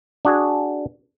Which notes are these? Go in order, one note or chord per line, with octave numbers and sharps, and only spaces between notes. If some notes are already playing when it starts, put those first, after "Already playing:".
D4 F#4 G#4